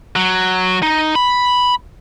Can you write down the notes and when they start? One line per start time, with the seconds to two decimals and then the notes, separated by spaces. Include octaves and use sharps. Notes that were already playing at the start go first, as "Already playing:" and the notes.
0.16 F#3
0.83 D#4
1.16 B5